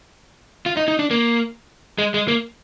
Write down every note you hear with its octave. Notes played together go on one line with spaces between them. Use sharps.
F4
D#4
D#4
D4
A#3
G#3
G#3
A#3